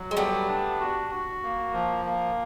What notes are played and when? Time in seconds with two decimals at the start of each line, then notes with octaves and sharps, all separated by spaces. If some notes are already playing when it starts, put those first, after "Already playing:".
Already playing: F#3
0.11 G#3
0.16 G3 A3 B3
0.48 D4
0.80 F#4
1.10 F#4
1.43 A#3
1.73 F3
2.05 A#3